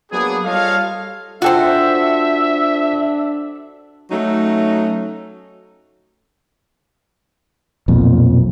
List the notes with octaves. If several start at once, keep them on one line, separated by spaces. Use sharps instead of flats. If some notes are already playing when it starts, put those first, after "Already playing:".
F#3 A#3 B3 D4 G#4
G3 F4 A4 C#5 D#5 F5
D4 F4 F#4 A4 C5 E5 G5
F#3 A3 C#4 D#4
B1 F2 A#2